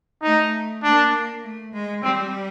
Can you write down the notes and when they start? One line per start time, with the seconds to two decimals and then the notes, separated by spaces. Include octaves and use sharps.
0.22 A3 D#4
0.83 A#3 D4
1.43 A3
1.73 G#3
2.03 G3 C4